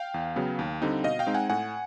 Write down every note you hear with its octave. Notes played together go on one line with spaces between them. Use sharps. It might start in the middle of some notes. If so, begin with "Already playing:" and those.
Already playing: F5 G5
E2
C#3 F#3 B3
D#2
D3 G3 C4 D#4
B2 D#5 F5
F5 G5
G#3 C4 D#4
F#5 G#5
A2 F#5 G#5